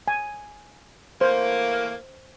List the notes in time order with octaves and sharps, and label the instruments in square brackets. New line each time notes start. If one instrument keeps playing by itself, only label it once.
[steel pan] G#5
[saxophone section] E3 A3 A#3 [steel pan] C5